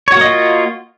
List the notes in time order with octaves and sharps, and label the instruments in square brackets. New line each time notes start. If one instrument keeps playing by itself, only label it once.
[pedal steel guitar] C#5
F#4
A#3
D#5
F4